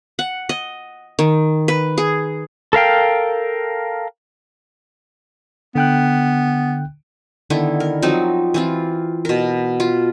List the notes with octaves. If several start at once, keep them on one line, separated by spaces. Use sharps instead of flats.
F#5
D#5
D#3
B4
G#4
A4 A#4 F5 G5
D3 B3 G5 F#6
D3 D#3 B3 E4
A#4
F3 F#3 C4 D#4
E3 C4 F4
B2 A#4
F4